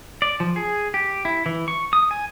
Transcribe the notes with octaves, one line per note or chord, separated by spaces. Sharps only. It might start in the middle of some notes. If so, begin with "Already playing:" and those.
D5
F3
G#4
G4
E4
E3
C#6
D#6
G#5